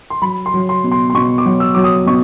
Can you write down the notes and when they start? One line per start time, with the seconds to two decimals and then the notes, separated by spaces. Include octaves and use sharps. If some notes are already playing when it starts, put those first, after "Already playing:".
0.10 C6
0.22 F#3 B5
0.46 C6
0.54 F#3
0.69 C6
0.84 B2
0.92 C6
1.10 C6
1.14 B2 C#6
1.38 D6
1.46 F#3
1.60 E6
1.74 F#3 D6
1.84 D#6
2.06 B2 C#6